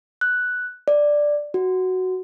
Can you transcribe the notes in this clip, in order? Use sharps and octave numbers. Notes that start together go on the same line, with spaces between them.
F#6
D5
F#4